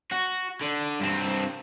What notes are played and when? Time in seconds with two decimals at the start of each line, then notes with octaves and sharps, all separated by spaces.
0.12 F#4
0.61 D3
1.00 G2 C4